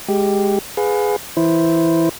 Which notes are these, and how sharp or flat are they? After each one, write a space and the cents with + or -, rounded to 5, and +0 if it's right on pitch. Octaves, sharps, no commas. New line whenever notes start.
G#3 +0 G4 +0
G#4 +0 B4 +15 F5 +40
E3 +0 E4 +0 C5 +0